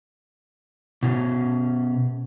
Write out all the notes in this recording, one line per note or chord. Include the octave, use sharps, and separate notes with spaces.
B2 C#4